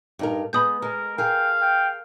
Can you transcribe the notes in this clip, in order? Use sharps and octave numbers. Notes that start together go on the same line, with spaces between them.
G2 D#4 A#4
G#3 B3 B5 D#6 G6
G#3 A#4
G#4 A#4 F5 G5
G5